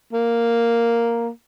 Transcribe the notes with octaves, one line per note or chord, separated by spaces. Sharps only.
A#3